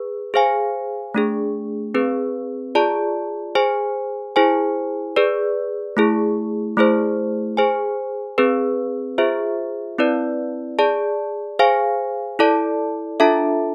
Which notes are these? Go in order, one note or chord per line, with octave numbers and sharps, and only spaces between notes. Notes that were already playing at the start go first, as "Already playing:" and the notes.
Already playing: G#4 B4
G#4 C5 F5 G#5
A3 D4 G#4
C4 G#4 B4
F4 G#4 D5 A5
G#4 C5 G#5
E4 G#4 C5 G#5
G#4 B4 D5
A3 E4 G#4
A3 E4 G#4 C5
G#4 C5 G#5
C4 G#4 B4
F4 G#4 C5 E5
C4 E4 B4 D5
G#4 D5 A5
G#4 C5 F5 G#5
E4 A4 D5 A5
D4 F4 A4 E5 A5